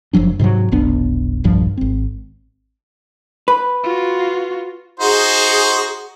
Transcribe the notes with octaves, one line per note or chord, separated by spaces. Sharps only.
F#1 F3 F#3 D4
G#2 C3 D#3 F#3
F1 B1 B3 D4
D#1 B1 G2 F3
G#1 C4
B4
F4 F#4
D#4 F#4 G#4 C5